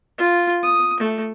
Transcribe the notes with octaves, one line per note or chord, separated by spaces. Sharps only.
F4
D#6
A3